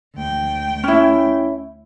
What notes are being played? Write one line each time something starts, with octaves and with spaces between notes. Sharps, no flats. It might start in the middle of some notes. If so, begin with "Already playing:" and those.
D2 G5
C#4 E4